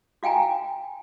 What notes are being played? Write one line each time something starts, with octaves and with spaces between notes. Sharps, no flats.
F#4 F5 G5 G#5 A#5